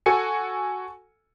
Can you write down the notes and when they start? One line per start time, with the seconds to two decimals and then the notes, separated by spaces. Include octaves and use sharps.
0.06 F#4 A4 G#5 C#7